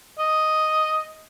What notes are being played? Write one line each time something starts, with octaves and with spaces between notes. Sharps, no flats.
D#5